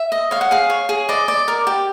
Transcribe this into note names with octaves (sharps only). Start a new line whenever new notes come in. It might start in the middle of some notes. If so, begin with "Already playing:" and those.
Already playing: E5
D#5
C#5 F5
F#5
G#4 F5
C#5
G#4
D5 D#5
D5
A#4
G4